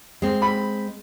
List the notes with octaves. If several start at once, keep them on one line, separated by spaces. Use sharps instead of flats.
G#3 C4
B5